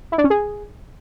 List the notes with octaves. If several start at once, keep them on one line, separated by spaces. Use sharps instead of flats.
E4
D4
C#4
G#4